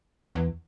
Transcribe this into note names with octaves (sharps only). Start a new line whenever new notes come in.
E2